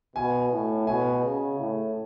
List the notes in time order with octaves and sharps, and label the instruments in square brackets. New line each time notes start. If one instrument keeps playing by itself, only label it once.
[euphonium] B2 [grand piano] G#5
[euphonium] A2
[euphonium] B2 [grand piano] G#5
[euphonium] C#3
A2